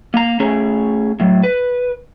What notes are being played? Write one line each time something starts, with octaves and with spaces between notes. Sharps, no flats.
A#3 A#5
A3 C#4 G#4 C#5
A2 F#3
B4